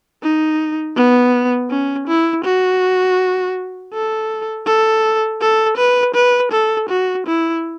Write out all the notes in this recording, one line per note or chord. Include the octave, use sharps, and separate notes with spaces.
D#4
B3
C#4
E4
F#4
A4
A4
A4
B4
B4
A4
F#4
E4